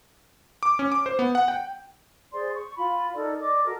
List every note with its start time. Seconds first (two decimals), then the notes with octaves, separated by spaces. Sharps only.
0.63 D6
0.79 C#4
0.92 D6
1.06 C5
1.19 B3
1.35 F#5
1.48 G5
2.32 G#4 C5 D5 C6
2.53 C#6
2.77 F4 B5
3.15 D#4 A4 A#4 D5
3.39 D5 D#5 D6
3.64 F#4 A4 A#4